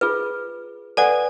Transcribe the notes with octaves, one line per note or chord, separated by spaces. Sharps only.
F4 G#4 B4
A4 B4 D5 F#5 G#5